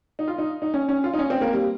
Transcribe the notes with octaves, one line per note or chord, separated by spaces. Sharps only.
D#4
F4
D#4
D#4
C#4
C#4
F4
D#4
C#4
C4
A#3
G3